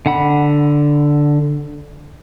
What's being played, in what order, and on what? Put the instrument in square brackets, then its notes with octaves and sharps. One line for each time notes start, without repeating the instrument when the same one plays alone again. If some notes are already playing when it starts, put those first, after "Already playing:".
[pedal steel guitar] D3 F#5 B5